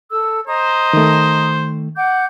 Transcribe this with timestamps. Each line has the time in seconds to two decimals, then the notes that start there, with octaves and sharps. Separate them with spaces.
0.11 A4 E6
0.48 C5 D#5 A#5 D#6
0.93 D#3 A3
1.96 F#5 D6 G6